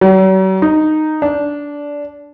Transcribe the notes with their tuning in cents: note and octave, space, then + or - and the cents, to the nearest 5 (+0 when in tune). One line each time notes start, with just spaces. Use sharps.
F#3 +45
D#4 -10
D4 -15